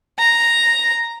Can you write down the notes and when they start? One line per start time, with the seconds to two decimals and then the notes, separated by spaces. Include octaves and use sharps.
0.19 A#5